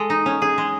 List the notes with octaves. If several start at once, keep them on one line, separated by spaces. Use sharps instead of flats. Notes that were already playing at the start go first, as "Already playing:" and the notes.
Already playing: G#3 A4
D#4
C#4
G#4
G#3